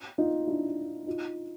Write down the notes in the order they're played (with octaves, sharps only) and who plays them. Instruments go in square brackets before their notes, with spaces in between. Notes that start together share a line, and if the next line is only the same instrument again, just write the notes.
[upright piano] D#4 F4
D4 E4
D#4 F4